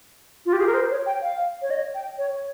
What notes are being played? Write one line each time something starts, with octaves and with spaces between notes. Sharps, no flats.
F4
G4
G#4
A#4
C5
C#5
G5
F5
C#5
D#5
G5
C#5